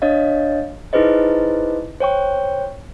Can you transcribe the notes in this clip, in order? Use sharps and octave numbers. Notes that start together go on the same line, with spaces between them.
D4 C#5 D#5 F5
D#4 E4 G#4 B4 C5 D#5
C5 C#5 G5 C#6